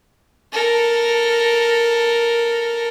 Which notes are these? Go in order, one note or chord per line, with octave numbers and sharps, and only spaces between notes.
A4 A#4